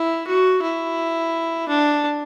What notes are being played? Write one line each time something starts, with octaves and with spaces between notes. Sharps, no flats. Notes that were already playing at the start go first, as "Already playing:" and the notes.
Already playing: E4
F#4
E4
D4